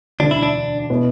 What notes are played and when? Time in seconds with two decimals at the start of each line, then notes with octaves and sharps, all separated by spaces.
0.20 E1 D2 D3 D4
0.31 E4
0.43 D4
0.90 B2 B3 E4